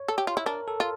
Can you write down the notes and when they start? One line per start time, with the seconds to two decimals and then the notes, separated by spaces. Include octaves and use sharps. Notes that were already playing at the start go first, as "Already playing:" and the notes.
Already playing: C#5
0.08 A4
0.18 G4
0.27 F4
0.37 E4
0.46 D4 A#4
0.68 A4
0.80 F4